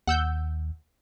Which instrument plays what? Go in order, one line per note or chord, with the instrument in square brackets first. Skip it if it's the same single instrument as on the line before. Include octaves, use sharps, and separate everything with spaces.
[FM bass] D#2 [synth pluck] F#5 E6 G6